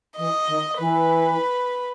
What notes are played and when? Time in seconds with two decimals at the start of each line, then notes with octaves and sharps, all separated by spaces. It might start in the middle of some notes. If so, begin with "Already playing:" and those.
0.17 E3 D#5
0.47 D#3
0.78 E3 B4